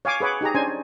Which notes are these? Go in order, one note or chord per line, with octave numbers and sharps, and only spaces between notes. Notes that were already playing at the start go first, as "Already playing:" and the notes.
C#5 F5 G#5 D6
G#4 B4 C#5 F#5 D6
D#4 G4 G#4 A#5
C#4 D4 C5 G#5